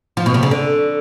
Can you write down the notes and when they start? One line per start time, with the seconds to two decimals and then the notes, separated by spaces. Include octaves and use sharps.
0.17 F3
0.26 B2
0.34 C3
0.43 C#3
0.51 D3